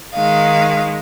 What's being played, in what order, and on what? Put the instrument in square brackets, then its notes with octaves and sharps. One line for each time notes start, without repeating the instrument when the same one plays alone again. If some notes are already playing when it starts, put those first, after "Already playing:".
[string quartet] D#3 G#3 D#4 F5